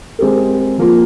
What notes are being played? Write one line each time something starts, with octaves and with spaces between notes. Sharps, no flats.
G#3 C4 G4 A#4
F3 A#3 F4